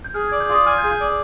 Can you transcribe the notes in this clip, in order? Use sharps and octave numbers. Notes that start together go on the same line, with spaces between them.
G6
G#4 F6
D5 G#6
G6
F4 D#6
G#5 F6
G6
G#4
G6
D5